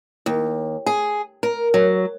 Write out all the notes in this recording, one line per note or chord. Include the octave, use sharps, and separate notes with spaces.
D#2
G#4
A#4
F#3